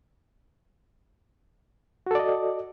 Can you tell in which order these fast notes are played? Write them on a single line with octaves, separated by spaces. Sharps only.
F#4 A4 D5 D#5